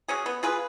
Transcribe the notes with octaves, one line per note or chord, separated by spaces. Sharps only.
F#3 C#4 G#4
B3
F4 G#4 B4